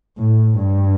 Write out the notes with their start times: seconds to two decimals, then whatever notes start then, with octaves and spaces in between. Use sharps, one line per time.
0.19 A2
0.59 G2